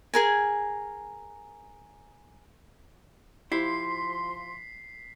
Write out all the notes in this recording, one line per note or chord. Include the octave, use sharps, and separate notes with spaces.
G#4 A#4 G#5
F3 E4 G4 C6 B6 C7